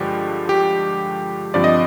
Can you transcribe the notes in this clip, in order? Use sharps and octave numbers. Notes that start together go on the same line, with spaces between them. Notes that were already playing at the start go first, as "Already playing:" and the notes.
Already playing: G2 D3 F3 G#3 G4
G4
G2 D3 F3 C4 D5
D#5